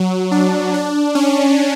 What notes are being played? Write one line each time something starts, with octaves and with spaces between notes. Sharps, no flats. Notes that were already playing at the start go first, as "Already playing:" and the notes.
Already playing: F#3
D4
D4
C#4